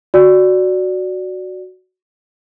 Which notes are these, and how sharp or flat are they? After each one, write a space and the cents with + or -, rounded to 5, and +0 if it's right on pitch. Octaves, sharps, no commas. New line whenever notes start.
F#4 +0 D5 +0